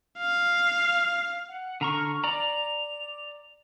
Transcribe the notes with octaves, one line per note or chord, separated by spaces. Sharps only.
F5
F#5
D3 A#5 C#6 F6
D5 A#5 F7